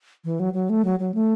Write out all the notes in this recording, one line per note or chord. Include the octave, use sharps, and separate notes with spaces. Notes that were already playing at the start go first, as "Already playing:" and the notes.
E3
F#3
F#3
A3
F#3
F#3
A3